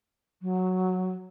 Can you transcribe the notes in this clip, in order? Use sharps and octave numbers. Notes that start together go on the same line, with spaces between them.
F#3